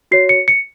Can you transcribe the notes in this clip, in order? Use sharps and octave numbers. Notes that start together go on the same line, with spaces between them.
F#4 C#5 C7
C#7
C#7